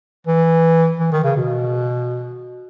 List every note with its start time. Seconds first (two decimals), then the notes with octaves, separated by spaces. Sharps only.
0.27 E3
1.00 E3
1.12 D#3
1.24 C#3
1.37 B2